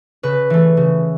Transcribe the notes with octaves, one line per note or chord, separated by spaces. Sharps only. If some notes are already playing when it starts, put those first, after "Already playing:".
C#3 B4
E3 A3
C#3